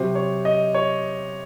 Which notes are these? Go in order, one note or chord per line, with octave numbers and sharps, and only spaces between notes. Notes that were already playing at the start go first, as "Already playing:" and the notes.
Already playing: C3 F#3 C5
C#5
D#5
C#5